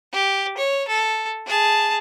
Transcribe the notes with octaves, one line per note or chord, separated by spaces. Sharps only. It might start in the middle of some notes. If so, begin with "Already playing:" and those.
G4
C#5
A4
G#4 A5